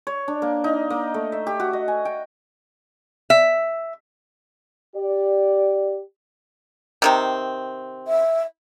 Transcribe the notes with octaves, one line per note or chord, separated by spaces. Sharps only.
C#5
D4
A#3
D#4
A#3
A3
E5
G4
F#4
D#5
G#5
G5
E5
G4 D5
C3 D#3 C4
E5